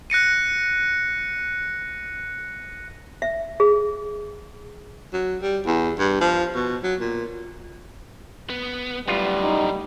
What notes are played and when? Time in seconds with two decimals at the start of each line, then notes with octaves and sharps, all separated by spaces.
0.10 F#6 A#6 C#7 D#7
3.22 E5
3.60 G#4
5.13 F#3
5.42 G3
5.66 E2
5.98 G2
6.21 F3
6.55 B2
6.83 F#3
7.00 A#2
8.50 B3
9.08 F#2 A2 G3 B3 F4
9.41 D#4